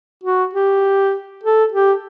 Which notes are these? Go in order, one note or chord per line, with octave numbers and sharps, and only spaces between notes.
F#4
G4
A4
G4